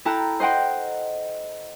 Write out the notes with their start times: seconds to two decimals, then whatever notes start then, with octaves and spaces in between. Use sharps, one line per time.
0.05 E4 A4 G5 A5 A#5 F#6
0.40 C5 D#5 F#5 G5 C6